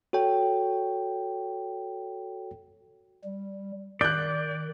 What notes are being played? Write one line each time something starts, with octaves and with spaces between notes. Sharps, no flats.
F#4 A4 C#5 G5
G3
D#3 D5 F#6 G6